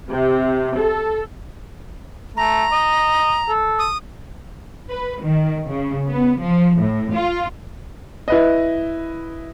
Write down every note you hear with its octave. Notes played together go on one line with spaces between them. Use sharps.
C3
A4
A3 A#5
D#5
A4
D#6
B4
D#3
C#3
B3
F3
A2
F4
E4 B4 D#5